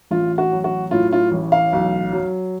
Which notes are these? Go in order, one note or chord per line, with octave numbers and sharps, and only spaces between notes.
A1 F4
F#4
F#3
F#4
A2 F4
F4
A1
F5
B1
F#3